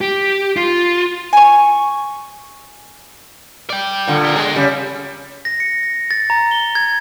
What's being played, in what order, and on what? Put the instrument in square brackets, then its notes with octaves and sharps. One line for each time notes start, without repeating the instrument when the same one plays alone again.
[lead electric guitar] G4
F4
[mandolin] G#5 C#6
[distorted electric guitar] D5 G5
[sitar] A#2 D3
[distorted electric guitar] G4 A#4
[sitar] G#3
C#3 G3
[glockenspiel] A#6
C#7
A#6
A6
A#5
G7
G#6